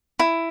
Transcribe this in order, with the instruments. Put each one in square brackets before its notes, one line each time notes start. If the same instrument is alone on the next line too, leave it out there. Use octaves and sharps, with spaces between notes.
[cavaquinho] E4